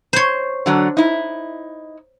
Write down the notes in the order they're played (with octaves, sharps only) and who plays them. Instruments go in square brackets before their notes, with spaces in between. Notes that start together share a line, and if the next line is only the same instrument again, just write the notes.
[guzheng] C5 C#5
[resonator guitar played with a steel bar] D3 F#3 D4
D#4 E4